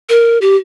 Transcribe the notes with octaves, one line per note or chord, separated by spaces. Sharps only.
A#4
G4